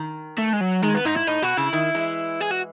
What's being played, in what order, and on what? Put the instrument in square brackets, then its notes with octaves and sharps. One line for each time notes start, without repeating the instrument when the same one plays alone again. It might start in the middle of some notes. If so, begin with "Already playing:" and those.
Already playing: [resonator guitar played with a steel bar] D#3
[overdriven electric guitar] A3
G#3
F#3
[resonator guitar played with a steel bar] D#3 [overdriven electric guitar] G#3
[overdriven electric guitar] B3
[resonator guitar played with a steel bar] G#2 [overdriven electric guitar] D#4
[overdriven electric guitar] E4
[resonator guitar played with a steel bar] A2 [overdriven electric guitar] D#4
[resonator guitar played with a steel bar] B2 [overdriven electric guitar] F#4
[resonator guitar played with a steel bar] C#3 [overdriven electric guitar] E4
[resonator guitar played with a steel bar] D#3
E3 G#3
[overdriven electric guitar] G#4
F#4